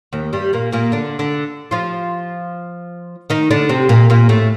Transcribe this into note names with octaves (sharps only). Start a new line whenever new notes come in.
D#2 D#3
G2 G3
A#2 A#3
A#2 A#3
D3 D4
D3 D4
F3 F4
D#3 D#4
D3 D4
C3 C4
A#2 A#3
A#2 A#3
A2 A3